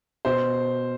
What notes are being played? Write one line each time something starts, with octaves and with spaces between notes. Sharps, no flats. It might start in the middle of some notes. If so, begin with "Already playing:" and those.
B2 C5